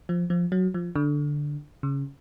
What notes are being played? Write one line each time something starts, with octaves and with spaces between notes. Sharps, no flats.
F3
F3
F#3
F3
D3
C#3